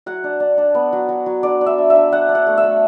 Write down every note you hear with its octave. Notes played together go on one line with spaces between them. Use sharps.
F#3 F#5
D4
D4
D4
B3
F#3
F#3
F#3
D4 D5
D4
E5
D4
E5
D4
D4 F#5
D4
F#5
A3
E5
A3